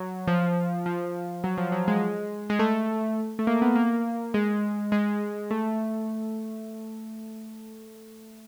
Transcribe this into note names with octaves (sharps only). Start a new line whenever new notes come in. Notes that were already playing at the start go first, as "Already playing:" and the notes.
Already playing: F#3
F3
F3
F#3
F3
F#3
G#3
G#3
A3
A3
A#3
B3
A#3
G#3
G#3
A3